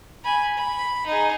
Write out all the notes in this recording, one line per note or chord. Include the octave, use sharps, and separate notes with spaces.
G#5 B5
B5
D#4 G#4